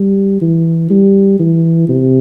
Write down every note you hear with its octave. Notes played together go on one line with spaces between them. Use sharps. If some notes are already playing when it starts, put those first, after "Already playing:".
Already playing: G3
E3
G3
E3
C3